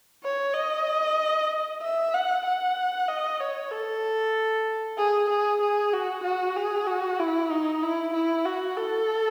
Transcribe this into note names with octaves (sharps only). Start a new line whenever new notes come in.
C#5
D#5
E5
F#5
F#5
D#5
C#5
A4
G#4
G#4
G#4
F#4
F#4
G#4
F#4
E4
D#4
E4
E4
F#4
A4